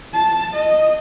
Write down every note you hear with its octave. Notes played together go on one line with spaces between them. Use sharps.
A5
D#5